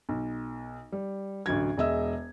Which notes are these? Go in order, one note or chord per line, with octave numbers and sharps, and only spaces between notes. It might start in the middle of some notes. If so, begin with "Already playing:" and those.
B1
G3
A1 D2 F#3 G#6
E1 G#3 D#5 E5 E6